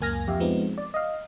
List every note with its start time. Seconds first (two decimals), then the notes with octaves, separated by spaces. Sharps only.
0.01 C#2 F#2 A#3 G#5 F6 A#6
0.28 F2 G4 E5 F5
0.40 F3 G#3 B3 C4 D#4
0.78 D5
0.94 D#5 F5